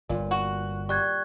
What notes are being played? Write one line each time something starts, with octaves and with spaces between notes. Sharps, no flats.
G1 A#2
F#4
G3 C#6 F#6 G#6